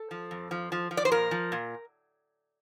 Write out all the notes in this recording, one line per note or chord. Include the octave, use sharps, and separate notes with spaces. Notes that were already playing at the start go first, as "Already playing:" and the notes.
Already playing: A4
F3
F2
F3
F3
F3
D5
C5
A#2 A#4
F3
A#2